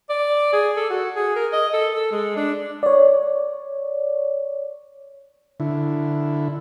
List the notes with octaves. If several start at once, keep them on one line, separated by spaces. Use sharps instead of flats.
D5
G#4
A4
F#4
G#4
A#4
D#5
A4
A4
G#3
D4
C#5 D5
D3 E4